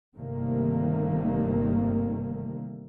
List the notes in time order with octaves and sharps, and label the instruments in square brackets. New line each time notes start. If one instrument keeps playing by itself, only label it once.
[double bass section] G1 C3 D#3 G3 A3 A#3